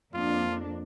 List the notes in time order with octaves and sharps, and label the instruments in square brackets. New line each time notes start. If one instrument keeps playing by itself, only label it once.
[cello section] F2 A#3 D4 [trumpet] F4